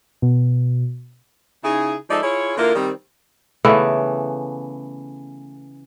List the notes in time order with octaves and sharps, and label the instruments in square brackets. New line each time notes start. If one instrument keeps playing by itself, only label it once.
[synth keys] B2
[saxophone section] C#3 D#4 E4 G#4
F3 G#3 D#4 A4 D5 E5
E4 F4 G#4 C#5
D3 A#3 E4 F4 A#4
D#3 G3 C4
[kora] C#3 E3 A3 B3